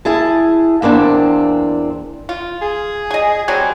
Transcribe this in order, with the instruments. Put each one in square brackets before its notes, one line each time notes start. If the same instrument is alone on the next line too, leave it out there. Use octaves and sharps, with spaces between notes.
[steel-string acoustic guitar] E4 G#4 A5
E2 A#3 C4 D4
[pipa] F4
[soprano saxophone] G#4
[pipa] D#5 G#5
[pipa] F#3 G3 C4 [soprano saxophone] G#5